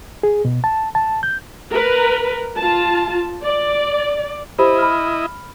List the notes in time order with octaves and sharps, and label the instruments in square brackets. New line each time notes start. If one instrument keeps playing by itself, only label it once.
[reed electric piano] G#4
B2
A5
A5
G6
[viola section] A#4 B4
F4 A5
D5
[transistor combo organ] E4 D#5 [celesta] G4 C5 B5
[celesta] B5 F6